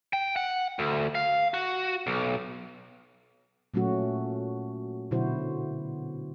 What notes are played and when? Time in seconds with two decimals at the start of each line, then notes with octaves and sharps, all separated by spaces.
0.13 G5
0.36 F#5
0.79 D2
1.15 F5
1.54 F#4
2.07 B1
3.74 A#2 F#3 A3 C#4 F#4
5.11 B2 D3 F#3 E4 F#4 C5